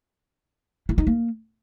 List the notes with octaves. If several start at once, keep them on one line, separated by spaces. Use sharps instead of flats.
E4
D#4
A#3